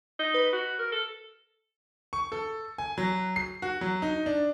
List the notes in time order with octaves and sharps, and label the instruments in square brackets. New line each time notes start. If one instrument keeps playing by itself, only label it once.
[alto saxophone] D#4
[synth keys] B4
[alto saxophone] F#4
A#4
A4
[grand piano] C#6
A4
G#5
F#3
C7
F#4
F#3
D#4
D4